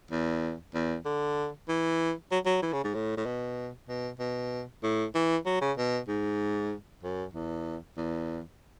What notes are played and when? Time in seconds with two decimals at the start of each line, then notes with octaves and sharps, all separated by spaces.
0.11 E2
0.74 E2
1.05 D3
1.68 E3
2.31 F#3
2.46 F#3
2.62 E3
2.73 C#3
2.84 G#2
2.94 A2
3.17 A2
3.26 B2
3.88 B2
4.19 B2
4.83 A2
5.15 E3
5.46 F#3
5.61 C#3
5.77 B2
6.08 G#2
7.03 F#2
7.34 E2
7.97 E2